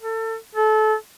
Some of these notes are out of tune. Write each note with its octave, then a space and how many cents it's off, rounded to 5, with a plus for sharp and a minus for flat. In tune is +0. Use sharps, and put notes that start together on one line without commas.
A4 +30
A4 -25